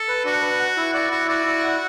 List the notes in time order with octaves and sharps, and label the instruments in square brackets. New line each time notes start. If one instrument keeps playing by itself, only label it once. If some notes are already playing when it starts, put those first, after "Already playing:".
Already playing: [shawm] A4
[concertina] B4
[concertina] D4 [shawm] F#4
[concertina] B4
F#5
E4
[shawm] F#4 [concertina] D5
[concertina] E4 [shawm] F#4
[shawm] F#4 [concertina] D5
[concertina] E4
F#5